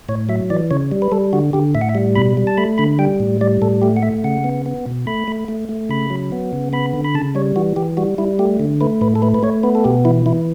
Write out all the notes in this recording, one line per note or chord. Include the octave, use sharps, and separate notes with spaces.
A2 C#5
F#3 E5
E3 D5
C#3 C#5
G3
B4
G3 A4
D3 F#4
D3 G4
A2 E5
F#5
E5
G3
B2 B5
G3
A5
A3 B5
D3 B5
G3 G5
A2
G3 D5
A2 A4
A3 G4
F#5
A3 E5
C#3 F#5
B3
B3
B2
A3 B5
A3
A3
A3
C#3 B5
F#3
B3
C#3
B3 B5
D3
B5
C#3 A5
G3 C#5
E3 F#4
E3 G4
G3 F#4
G3 E4
A3 G4
D3
A3 B4
A2 B4
A4
A3 B4
B4
A3 C#5
B3 B4
A4
B2 G4
E3 E4
E3 E4